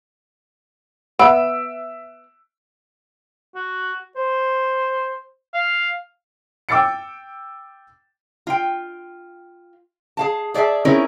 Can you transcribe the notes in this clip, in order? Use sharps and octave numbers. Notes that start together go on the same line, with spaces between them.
B3 E5 E6 D7
F#4
C5
F5
G5 D6 E6 A6 C#7
F4 G5
G#4 F5 A5
G#4 D5 E5 G#5 A5
C4 C#4 D#4 E4 G#4 A#4